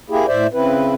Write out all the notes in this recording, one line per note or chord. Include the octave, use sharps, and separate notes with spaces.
A#3 E4 G4 G#4
A2 C5 D5 E5
C#3 C4 E4 B4